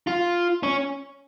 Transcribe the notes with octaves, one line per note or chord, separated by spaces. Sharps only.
F4
C#4